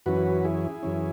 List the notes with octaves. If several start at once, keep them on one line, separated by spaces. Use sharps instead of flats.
F#2 E3 C#4 F#4 B4
E4 G#4
F#2 E3 C#4